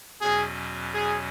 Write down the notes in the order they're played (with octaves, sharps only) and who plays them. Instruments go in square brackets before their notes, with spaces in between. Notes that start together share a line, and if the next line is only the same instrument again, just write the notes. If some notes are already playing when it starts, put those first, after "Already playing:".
[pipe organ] E2 B2 F#3 C#4 [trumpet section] G#4
[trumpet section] G#4